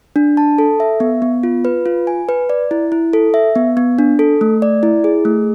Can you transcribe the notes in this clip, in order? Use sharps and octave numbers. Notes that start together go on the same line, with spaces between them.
D4
A5
A4
E5
B3
B3
F4
B4
F4
G#5
B4
D5
E4
E4
A4
E5
B3
B3
D4
A4
A3
D5
E4
G#4
A3